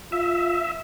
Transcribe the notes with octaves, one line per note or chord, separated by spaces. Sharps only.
F4 E5